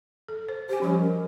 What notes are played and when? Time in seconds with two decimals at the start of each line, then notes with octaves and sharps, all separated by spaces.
0.28 A4
0.49 C5
0.69 G4 C5 G#5
0.82 F3 G3 C#4
1.00 A#4